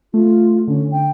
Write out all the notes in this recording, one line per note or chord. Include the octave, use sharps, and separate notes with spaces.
A3 F4
D3 C#4
G5